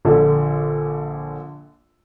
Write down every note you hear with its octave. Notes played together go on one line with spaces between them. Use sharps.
A#1 D3 A4